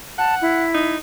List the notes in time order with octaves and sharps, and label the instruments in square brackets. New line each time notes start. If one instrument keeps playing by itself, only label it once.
[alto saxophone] F#5 [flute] A5
[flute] E4
[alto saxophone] D#4